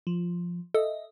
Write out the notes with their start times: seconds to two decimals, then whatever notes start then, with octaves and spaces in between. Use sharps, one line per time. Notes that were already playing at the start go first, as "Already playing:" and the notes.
0.07 F3
0.74 A4 D#5 E5